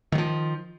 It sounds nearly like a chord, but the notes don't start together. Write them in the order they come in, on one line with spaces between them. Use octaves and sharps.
D#3 F#3 F3